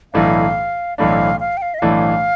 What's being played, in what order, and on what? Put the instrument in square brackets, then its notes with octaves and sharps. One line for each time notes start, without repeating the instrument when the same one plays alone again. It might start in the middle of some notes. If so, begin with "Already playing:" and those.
[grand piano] B1 A2 E3 A3 D4 [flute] F5
[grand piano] B1 A2 E3 A3 D4 [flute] F5
[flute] F5
G5
F5
D#5
[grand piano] B1 A2 E3 A3 D4 [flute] F5